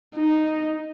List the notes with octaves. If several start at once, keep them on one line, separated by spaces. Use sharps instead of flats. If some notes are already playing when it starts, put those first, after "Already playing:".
D#4